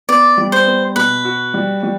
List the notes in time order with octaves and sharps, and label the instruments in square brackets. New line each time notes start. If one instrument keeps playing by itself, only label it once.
[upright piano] B3 [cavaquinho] D5
[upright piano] G3
[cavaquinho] C5
[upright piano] B3
[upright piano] B2 [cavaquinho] B4
[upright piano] F#4
G3
G3